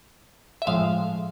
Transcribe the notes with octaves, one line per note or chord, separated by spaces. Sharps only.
E5
A2 F3 G#3 F5